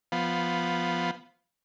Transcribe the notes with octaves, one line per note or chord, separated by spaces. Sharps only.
F3 B3